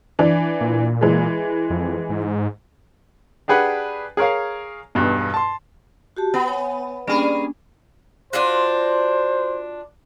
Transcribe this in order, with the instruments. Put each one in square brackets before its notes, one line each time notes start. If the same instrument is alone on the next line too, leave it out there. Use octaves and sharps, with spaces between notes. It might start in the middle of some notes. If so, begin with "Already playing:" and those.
[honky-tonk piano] E3 D4
[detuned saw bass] A#2
[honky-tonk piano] E3 G#3
[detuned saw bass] F2
G#2
[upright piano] D4 G4 G#4 B4 F#5
G#4 A#4 C#5 F5
B1 E2 G2 B2
A5 C6
[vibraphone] F#4 G4 A5
[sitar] B3 [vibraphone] F#5
[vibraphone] C#5 G#5
[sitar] G3 G#4 [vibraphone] A#3 C#4 D4
[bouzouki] D4 F4 F#4 [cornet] C5